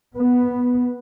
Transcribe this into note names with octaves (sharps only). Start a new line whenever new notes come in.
B3